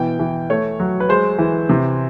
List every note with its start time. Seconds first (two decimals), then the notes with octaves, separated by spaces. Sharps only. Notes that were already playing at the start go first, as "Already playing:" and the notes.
Already playing: B2 E3 G5
0.19 E3
0.50 A3 C#5
0.80 F#3
1.00 B4
1.09 G#3 C5
1.38 E3
1.69 C3